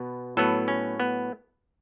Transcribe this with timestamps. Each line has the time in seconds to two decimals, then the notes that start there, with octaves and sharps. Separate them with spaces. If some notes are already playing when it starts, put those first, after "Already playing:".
Already playing: B2 B3
0.37 A2 F#3 B3 A4
0.68 C#4
1.00 B3